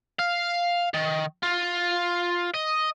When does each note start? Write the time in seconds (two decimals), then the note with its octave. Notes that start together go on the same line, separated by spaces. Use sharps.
0.19 F5
0.94 D#3
1.43 F4
2.54 D#5